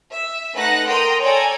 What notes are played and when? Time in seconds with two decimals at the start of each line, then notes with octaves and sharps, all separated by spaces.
0.10 E5
0.54 A3 D#4 B4 F#5 F#6 A#6
0.87 A#4 G5 A#5 C6 D#6
1.20 A4 C#5 D5 G5 G#5 A#5